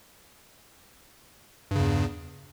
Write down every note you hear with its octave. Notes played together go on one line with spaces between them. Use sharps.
E2 G2 C#3